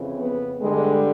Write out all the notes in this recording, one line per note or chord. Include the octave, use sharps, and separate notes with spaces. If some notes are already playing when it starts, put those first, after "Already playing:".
Already playing: F2 C#3 E3
B3
G2 D3 G3 G#3